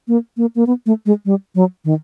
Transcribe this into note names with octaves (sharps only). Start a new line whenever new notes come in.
A#3
A#3
A#3
B3
A3
G#3
G3
F#3
D#3